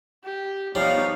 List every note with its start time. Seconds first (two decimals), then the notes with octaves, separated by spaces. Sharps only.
0.24 G4
0.75 F3 G3 B3 D#4 C#5 F5